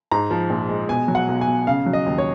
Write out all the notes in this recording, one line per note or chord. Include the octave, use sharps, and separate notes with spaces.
G#2 A#5
F3
A#1
G#3
B2 G#5
F#3
F#5
B1
G#5
B1
C#3 F5
F#3
D#5
D#2
C#5